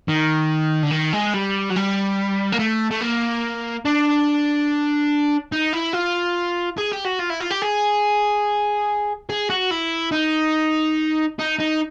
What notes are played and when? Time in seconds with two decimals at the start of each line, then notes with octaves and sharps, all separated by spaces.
0.08 D#3
0.83 D3
0.91 D#3
1.13 G#3
1.33 G3
1.70 F#3
1.76 G3
2.52 A#3
2.59 A3
2.91 A3
3.01 A#3
3.85 D4
5.52 D#4
5.73 E4
5.93 F4
6.78 G#4
6.92 G4
7.05 F#4
7.19 F4
7.30 E4
7.40 F4
7.51 G4
7.62 G#4
9.30 G#4
9.50 F#4
9.71 E4
10.12 D#4
11.39 D#4
11.59 D#4